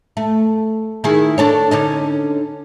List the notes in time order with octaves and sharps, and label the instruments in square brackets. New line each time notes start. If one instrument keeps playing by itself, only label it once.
[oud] A3
D#3 E4 G#4
D4 A4 C#5
D3 C#4 D#4